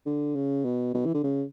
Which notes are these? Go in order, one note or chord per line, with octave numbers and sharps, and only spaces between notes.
D3
C#3
B2
B2
E3
D3
C#3